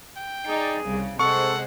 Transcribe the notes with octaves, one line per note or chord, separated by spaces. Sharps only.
G5
D#4 G#4 D5
C2 C#3
C3 G#3 A4 C5 F#5 C#6